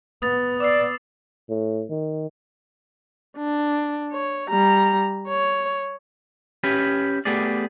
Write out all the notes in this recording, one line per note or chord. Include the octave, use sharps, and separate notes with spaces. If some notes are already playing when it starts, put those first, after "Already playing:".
B3 D#6 A6
D5 D6 E6 C7
A2
D#3
D4
C#5
G3 A#5
C#5
C#4 G4 B4
A3 B3 G4 G#4 D5